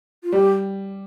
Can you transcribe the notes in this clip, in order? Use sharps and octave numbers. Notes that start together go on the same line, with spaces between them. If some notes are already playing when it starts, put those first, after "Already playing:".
F4
G3 G4